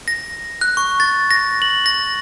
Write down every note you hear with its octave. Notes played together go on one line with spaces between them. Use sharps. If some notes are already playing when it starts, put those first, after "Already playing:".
A#6
F#6
C#6
A6
A#6
F#7
A#6